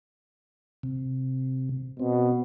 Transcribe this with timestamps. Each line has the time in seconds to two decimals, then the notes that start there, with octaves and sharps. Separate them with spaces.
0.83 C3
1.99 B2 C4